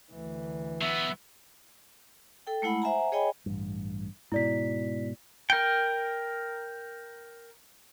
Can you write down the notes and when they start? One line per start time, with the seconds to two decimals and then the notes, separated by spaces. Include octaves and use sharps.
0.11 D2 E3
0.82 F#3 B3 E5
2.47 A4 G5
2.62 G#3 A3 E4 F#5 B5
2.82 C5 E5 F#5 G#5 A#5
3.12 G#4 C#5 D#5 G5 G#5 B5
3.46 A1 G2
4.32 G#2 B2 E4 D5 B6
5.50 A#4 G5